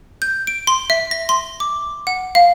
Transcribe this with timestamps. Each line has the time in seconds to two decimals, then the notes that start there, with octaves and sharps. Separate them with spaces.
0.22 G6
0.47 D7
0.67 C6
0.90 E5
1.11 A#6
1.29 C6
1.60 D6
2.07 F#5
2.35 F5